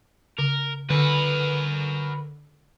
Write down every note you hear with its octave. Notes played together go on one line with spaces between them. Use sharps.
C#3 A#4
D3 F#4 A#4 B4